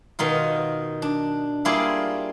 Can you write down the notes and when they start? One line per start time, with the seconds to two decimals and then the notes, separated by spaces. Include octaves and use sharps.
0.19 B2 D#3 D#4 F4
1.02 D4
1.65 G3 A#3 E4 F4 G#4 D5